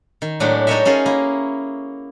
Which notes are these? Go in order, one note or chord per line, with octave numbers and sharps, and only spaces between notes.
D#3
A2 F#3 G#3 D4 G4
D#4 A4 A#4 C#5 D#5 E5
C#4 D#4 F4 G#4 A#4
A#3 E4